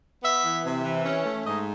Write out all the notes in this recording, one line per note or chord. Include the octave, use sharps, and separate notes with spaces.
B3 E5
E3
C3
E3
C#4
A3
G#2 D#5